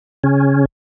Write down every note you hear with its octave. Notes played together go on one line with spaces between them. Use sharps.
C#3 C#4